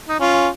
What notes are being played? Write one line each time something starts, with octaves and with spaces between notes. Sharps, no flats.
D#4
C#4 F4